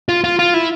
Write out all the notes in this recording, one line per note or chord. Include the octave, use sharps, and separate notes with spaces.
F4
F4
F4
E4